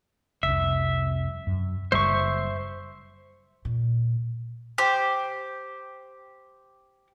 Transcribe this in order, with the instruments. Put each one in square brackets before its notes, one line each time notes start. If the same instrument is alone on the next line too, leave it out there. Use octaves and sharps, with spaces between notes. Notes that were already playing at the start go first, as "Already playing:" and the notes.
[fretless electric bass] F1 C2 [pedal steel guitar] E5
[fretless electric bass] F#2
[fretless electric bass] F#1 C2 G3 [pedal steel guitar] C5 E5 C#6
[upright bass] A#2
[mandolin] G4 C5